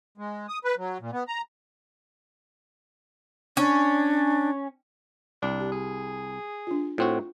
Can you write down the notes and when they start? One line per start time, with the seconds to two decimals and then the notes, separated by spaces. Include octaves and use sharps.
0.18 G#3
0.48 D#6
0.64 B4
0.78 F#3
1.01 A#2
1.13 B3
1.28 A#5
3.57 C#4 D4
5.43 C2 D4
5.60 G4
5.72 G#4
6.67 D4 F4
6.98 A2 C4 F4 F#4